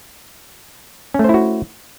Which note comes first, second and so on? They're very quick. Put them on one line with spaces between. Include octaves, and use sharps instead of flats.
C#4 A3 C5 E4 F#4